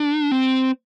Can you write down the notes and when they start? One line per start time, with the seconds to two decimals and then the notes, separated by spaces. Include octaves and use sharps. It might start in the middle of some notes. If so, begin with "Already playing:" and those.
Already playing: D4
0.31 C4